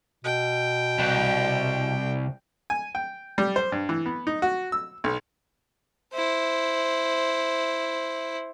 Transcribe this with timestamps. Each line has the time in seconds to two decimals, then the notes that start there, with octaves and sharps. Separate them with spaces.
0.24 B2 G5
0.99 C2
2.70 G#5
2.95 G5
3.38 G3
3.56 C5
3.72 G2
3.89 E3
4.06 B3
4.27 D#4
4.42 F#4
4.72 E6
5.04 B1
6.14 E4 C5